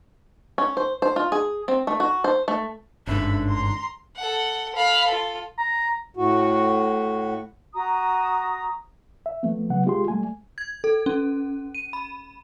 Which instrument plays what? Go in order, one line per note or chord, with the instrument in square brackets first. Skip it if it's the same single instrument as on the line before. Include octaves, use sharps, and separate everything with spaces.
[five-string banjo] C#4
C5
C5
F4
G#4
C4
A3
F#4
C5
A3
[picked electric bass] G1 G#2 [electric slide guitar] D3 C#4 [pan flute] D4 [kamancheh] E5 B5
[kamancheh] A#5 C6
[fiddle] A4 F#5
F5 B5
F4 A4
[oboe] A#5
[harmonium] A2 F#4
[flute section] F#4 A#5 D#6
[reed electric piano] E5
F3 A3 B3
C#3 F#3 B3 F#5
G#3 F4 G4 G#4 C6
G3 A3 G#5
[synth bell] G#6
A4
C#4
D#7
B5